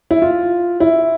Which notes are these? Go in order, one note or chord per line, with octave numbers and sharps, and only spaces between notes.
E4
F4
E4